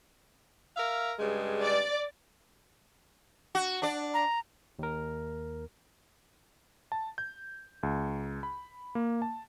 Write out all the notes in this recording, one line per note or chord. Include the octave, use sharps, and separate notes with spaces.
A#4 E5 F5
G2 C#3 G#3
D5
F#4
D4 D5
A#5
D#2 A#4
A5
G6
C#2
B5
A#3
A5